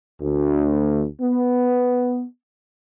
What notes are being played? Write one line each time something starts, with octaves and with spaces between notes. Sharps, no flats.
D2
B3